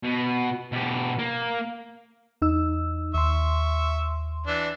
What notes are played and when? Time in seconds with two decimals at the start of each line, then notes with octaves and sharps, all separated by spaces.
0.04 B2
0.72 B2 G4
1.19 A#3
2.42 E2 D#4 E6
3.15 D#2 E5 C6 C#6
4.47 E3 D4